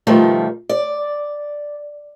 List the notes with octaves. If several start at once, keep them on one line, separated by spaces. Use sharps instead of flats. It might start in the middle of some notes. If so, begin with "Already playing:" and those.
B2 D#3 F3 G3 A3
D5